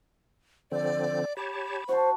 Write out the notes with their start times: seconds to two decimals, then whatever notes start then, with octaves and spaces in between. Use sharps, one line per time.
0.72 D3 F3 C4 D5
1.37 G4 C#5 A5 B5
1.89 F#4 C5 A5